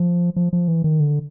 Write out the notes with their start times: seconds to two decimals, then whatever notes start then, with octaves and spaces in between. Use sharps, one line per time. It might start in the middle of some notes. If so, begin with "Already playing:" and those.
Already playing: F3
0.36 F3
0.53 F3
0.68 E3
0.84 D#3
1.00 D3